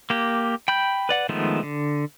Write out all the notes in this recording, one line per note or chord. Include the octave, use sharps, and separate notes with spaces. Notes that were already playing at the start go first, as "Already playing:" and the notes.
A#3 G4
G5 B5 G6
B4 D5 F#5
D#3 F3 G#3 A3 B3
D3